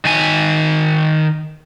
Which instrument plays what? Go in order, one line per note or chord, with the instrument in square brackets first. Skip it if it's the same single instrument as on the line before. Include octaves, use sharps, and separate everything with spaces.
[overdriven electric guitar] D#3 G#5